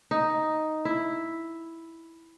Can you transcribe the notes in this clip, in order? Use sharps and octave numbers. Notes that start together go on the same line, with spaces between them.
D#4
E4